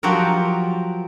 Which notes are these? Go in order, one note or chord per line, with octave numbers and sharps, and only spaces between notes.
F3 F#3 F#4 G4 A#4